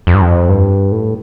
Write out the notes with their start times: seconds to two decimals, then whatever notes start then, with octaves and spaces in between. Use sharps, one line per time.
0.07 F2
0.14 G2
0.21 F2
0.49 G2
0.92 A2